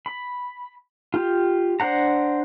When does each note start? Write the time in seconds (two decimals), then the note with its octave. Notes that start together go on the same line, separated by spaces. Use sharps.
0.06 B5
1.14 F4 G4
1.80 D4 C5 F#5 A#5